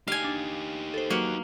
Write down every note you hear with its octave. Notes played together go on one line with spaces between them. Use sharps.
D#4 G4 F5 G#5
D4
A4 C5
F#3 A#3 F#4 B4